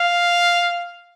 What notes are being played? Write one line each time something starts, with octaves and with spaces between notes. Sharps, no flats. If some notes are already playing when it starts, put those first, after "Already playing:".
Already playing: F5